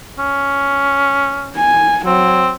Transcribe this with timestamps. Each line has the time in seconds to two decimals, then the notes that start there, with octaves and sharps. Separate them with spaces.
0.19 C#4
1.56 G#5
2.06 F#3 C4